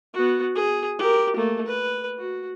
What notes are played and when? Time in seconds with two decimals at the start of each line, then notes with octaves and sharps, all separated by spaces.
0.14 B3 F#4
0.55 G#4
0.99 G4 A#4
1.36 A3 A#3
1.66 B4
2.18 F#4